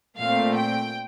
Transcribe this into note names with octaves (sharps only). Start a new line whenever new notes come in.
A#2 A3 C4 F5
G5